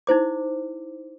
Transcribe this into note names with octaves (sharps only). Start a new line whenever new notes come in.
D#4 E4 C5 D6